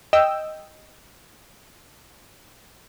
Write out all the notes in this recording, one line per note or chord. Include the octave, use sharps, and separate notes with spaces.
D#5 G5 E6